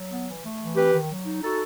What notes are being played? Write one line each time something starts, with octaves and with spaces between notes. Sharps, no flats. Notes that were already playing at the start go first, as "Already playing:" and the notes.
Already playing: F#3
B3
E3
A3
E3
C4 G4 B4
D#3
F#3
D#4
D#4 F#4 A4